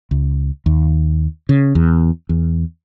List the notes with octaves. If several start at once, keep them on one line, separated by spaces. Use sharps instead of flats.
C#2
D#2
C#3
E2
E2